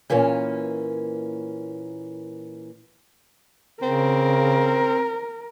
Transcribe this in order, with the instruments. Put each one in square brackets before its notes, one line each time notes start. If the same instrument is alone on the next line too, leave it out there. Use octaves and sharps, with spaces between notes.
[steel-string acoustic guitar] A#2 E3 A#3 C#4
[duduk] C#3 [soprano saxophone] C4 [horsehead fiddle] A#4